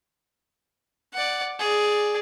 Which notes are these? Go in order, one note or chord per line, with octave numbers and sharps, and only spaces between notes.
D5 F#5
G#4 D5